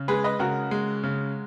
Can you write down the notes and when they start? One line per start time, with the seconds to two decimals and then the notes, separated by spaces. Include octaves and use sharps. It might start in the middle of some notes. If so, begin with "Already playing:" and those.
Already playing: C#3
0.08 G#3 G#4 B4
0.24 B4 D#5
0.39 C#3 F#4 A#4
0.71 G#3
1.03 C#3